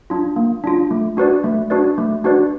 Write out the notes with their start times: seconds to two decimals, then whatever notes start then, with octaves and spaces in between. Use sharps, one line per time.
0.10 D4 F4
0.36 A#3
0.64 D4 F4
0.91 A3
1.17 D4 F#4 B4 D5
1.44 A3
1.70 D4 F#4 B4 D5
1.98 A3
2.24 D4 F#4 B4 D5